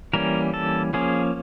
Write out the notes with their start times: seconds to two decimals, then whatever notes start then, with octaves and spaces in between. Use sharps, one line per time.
0.13 E3 G3 A#3 C#4 A#4
0.54 A4
0.93 F3 A#3 C#4 G#4